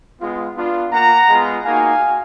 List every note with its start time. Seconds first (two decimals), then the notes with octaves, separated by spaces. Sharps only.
0.21 G#3 B3 F4
0.57 B3 D4 F4
0.93 A#3 F4 F#5 A#5
1.30 G#3 B3 F4
1.65 A#3 D#4 F#4 F5 G#5